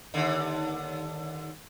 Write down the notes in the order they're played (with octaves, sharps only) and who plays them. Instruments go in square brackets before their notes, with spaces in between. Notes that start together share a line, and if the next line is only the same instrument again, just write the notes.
[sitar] D#2 D3